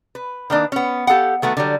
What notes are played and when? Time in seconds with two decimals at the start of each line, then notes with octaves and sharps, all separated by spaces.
0.15 B4
0.50 D#3 A#3 D4
0.72 B3 C#4
1.07 G4 A4 F5 F#5
1.42 D#3 A3 B3 F#4
1.57 D3 F#3 G3